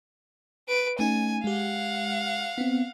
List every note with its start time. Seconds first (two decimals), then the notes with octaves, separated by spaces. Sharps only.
0.68 B4 D7
0.99 A3 C#4 D#4 G#5
1.44 G#3 G4 F5 F#5
2.58 B3 C4